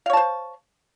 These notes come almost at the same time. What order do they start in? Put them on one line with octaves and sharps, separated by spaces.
F5 C#5 A5 C5